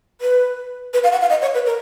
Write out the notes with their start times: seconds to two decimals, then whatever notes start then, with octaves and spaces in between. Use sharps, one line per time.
0.21 B4
0.94 B4
1.04 F5
1.12 F#5
1.21 F5
1.30 D#5
1.42 C#5
1.54 B4
1.66 A#4